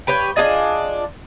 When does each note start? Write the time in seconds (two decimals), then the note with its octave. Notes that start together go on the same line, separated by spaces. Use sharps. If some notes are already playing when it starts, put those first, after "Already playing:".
0.07 G4 B4 C#5 G5
0.36 D4 F4 G#4 D#5